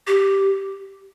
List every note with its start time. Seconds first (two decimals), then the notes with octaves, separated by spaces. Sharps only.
0.07 G4